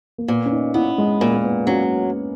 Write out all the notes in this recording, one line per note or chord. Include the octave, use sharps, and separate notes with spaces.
A#3
A#2 B3
C#4
D#4
B3 E4
G#3
A#2 A#3
A#3
B3
F#3 C#4